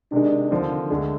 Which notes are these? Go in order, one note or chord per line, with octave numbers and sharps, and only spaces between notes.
C3 D#3 G#3 D4
D#2 D3 F3 C4
D2 D3 G#3